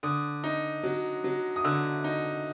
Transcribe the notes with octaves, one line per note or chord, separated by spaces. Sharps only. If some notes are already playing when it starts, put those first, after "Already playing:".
D3 D#6
D#4
F#3
F#3
D#6
D3 E6
D#4